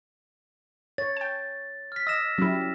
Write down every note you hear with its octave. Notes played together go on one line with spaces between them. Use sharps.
C#5 A6
G5 A5
F6 B6
D#5 E6 A#6 E7
F#3 C#4 E4 G4